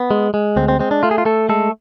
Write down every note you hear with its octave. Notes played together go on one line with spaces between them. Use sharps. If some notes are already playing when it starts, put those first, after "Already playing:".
Already playing: B3
G#3
G#3
D2 C4
C4
G#3 C4
D4
A3 F4
G#4
F4
A3 A4
G#3 A4